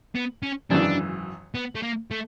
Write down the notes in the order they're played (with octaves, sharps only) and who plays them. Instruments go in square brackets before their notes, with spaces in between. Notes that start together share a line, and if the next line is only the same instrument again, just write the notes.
[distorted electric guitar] B3
C#4
[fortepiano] G#1 F#2 C#3 E3 [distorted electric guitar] D4
[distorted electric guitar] B3
A3
A#3
A3